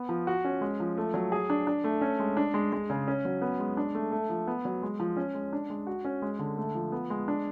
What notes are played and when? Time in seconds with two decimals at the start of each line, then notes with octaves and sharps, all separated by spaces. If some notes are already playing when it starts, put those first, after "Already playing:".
Already playing: B3
0.09 F3
0.27 F#4
0.45 C#4
0.61 G#3
0.80 F3
0.97 A3
1.14 F#3
1.32 G#4
1.50 D4
1.67 D4
1.84 A3
2.01 C#4
2.20 G#3
2.37 D4
2.54 G#3
2.72 G#3
2.90 C#3
3.08 C#4
3.25 F#3
3.42 B3
3.60 G#3
3.77 D4
3.95 A3
4.12 A3
4.30 F3
4.47 B3
4.65 F#3
4.83 G#3
5.00 F3
5.17 C#4
5.35 G#3
5.53 D4
5.70 G#3
5.87 F#4
6.05 C#4
6.22 G#3
6.39 D3
6.57 A3
6.75 F3
6.92 B3
7.10 G#3
7.28 D4